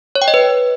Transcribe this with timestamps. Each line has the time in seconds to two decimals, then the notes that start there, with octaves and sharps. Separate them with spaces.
0.15 C#5
0.22 G5
0.28 D#5
0.34 B4